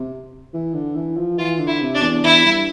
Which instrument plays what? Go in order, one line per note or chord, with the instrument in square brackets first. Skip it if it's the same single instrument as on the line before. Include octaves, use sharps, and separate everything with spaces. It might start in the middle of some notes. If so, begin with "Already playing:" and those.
Already playing: [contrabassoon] C3
E3
D3
E3
F3
[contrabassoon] E3 [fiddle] F4
[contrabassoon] D3
[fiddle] E4
[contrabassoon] C3
[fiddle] D4
[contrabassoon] E2
[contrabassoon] E2 [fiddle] E4
[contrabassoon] G2